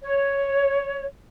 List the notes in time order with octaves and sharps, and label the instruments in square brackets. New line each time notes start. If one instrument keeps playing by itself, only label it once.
[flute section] C#5